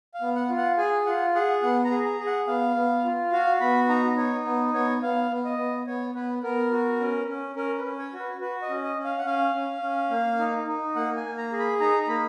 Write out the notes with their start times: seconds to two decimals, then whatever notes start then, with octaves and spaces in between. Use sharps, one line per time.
0.14 F5
0.21 B3
0.36 F#5
0.49 F4
0.57 F#5
0.78 G#4 G#5
1.06 F4 F#5
1.35 G#4 F#5
1.62 B3 F#5
1.85 A#5
1.91 G#4
2.05 A#5
2.19 G#4
2.27 F#5
2.47 B3 F5
2.76 B3
3.04 F4
3.32 F#4 F5
3.60 B3 B5
3.89 D#4 A#5
4.17 D#4 C#5
4.45 B3
4.74 B3 C#5
5.02 B3 F5
5.31 B3
5.45 D#5
5.58 B3
5.87 B3 C#5
6.15 B3 B4
6.43 B3 A#4
6.72 F#4
7.00 C#4
7.28 C#4
7.56 C#4 A#4
7.78 B4
7.84 C#4
7.99 C#5
8.13 F#4
8.20 B4
8.41 F#4 B4
8.62 D#5
8.69 C#4
8.83 D#5
8.98 C#4
9.04 F5
9.18 F#5
9.25 C#4 F5
9.54 C#4
9.82 C#4
10.10 A#3
10.39 D#4
10.67 D#4
10.95 A#3 F#5
11.16 G#5
11.24 A#3
11.38 A#5
11.52 G#4
11.59 B5
11.80 D#4 A#5
12.03 A#5
12.08 A#3 B5